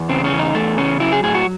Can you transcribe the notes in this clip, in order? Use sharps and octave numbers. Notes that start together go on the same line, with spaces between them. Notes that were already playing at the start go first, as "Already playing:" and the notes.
Already playing: E2
C#3 C4
C#4
E2
D#4
E2 A3
C#3 C#4
F#3 E4
G#4
A2 G#4
F#4